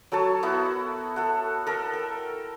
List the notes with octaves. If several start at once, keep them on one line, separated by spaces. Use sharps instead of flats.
F#3 A4 C#5 A5
B3 E4 F#4
A4 F#5
A4 A#4
G5